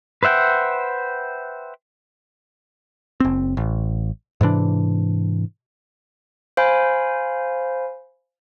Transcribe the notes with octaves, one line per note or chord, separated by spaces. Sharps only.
B4 C5 E5 F#5 G5
F#1 C4
A1
G#2 C3 E3 D4
C5 F5 G#5 B5